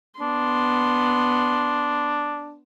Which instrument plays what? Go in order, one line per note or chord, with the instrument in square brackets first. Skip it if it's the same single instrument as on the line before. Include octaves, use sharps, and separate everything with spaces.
[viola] B3 C6 [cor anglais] D4